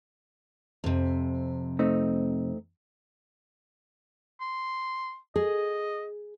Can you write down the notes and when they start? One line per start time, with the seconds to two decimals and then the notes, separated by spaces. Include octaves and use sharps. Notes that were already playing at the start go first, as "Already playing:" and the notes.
0.84 F2 C3
1.79 A3 C4 D#4
4.41 C6
5.36 G#4 D#5